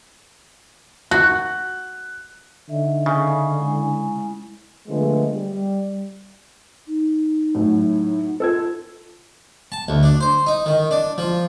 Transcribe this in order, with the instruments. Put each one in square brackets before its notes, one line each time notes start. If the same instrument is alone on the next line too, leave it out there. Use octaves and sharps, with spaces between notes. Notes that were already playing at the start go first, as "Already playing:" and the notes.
[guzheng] F#4 [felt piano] F#6
[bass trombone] D3 [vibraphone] D#4 D#5 E5
[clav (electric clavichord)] C#3
[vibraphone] G#3 E4 G#5
[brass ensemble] D3 F3 G#3 A3 B3
G3
[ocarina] D#4
[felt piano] A2 F#3
[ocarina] F4 [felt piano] A4 E6 G#6
[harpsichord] A5
D2
D4
C5
D#4
D#3
D4
F3